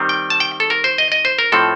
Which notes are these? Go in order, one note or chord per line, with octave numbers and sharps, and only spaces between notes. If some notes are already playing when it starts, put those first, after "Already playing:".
Already playing: D#3 G3 C4
G5
A5
G5
A4
A#4
C5
D#5
D#5
C5
A#4
A2 F3 C4 A4